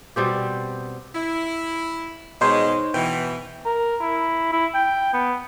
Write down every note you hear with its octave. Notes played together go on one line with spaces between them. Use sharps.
B2 G3 C4 G4
E4
B2 G#3 D#4 C5 C#5
B2 E3 G5
A#4
E4
E4
G5
B3